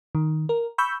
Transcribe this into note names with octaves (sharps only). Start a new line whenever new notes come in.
D#3
A#4
B5 C#6 E6 G6